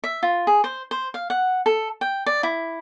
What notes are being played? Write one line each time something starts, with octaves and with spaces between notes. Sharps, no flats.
E5
F4
G#4
C5
C5
F5
F#5
A4
G5
D5
E4